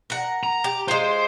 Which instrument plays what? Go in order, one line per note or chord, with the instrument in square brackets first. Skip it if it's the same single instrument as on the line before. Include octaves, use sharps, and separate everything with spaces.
[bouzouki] A#4 F#5
[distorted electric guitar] A#5
[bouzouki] G4
[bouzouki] G#3 F4 [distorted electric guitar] C5